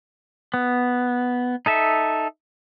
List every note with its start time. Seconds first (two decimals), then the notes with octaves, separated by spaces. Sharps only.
0.54 B3
1.66 D#4 A4 E5